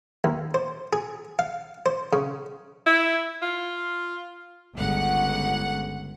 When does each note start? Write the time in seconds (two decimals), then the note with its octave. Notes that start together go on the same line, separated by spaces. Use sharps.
0.24 D#2
0.54 C5
0.93 G#4
1.39 F5
1.86 C5
2.13 C#3
2.86 E4
3.42 F4
4.75 G1 C#2 F#5